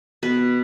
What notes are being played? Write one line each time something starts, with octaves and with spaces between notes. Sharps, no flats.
B2 B4